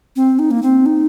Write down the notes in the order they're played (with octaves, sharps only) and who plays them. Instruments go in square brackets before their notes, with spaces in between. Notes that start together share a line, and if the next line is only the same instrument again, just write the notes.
[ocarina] C4
D#4
A#3
C4
D#4